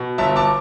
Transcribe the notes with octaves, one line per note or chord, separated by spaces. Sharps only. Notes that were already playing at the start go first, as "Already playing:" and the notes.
Already playing: B2
G1 E5 A5
A5 D6